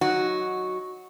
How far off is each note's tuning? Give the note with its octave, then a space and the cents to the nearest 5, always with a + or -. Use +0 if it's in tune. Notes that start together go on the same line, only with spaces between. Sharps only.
F#3 +0 D#4 +0 F#4 -5